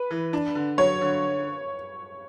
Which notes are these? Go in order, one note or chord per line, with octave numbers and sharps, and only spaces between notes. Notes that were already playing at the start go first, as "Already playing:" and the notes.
Already playing: B4
E3
D4
D3
F#3 C#5
D3